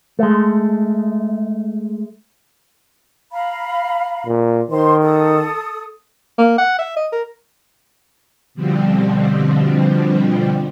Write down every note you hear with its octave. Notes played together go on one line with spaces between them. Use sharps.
G#3 A3
F5 A#5 B5
A#2
D#3 C5 C6
A4 D#6
A#3
F#5
E5
D#5
A#4
B2 D3 F3 G3 C4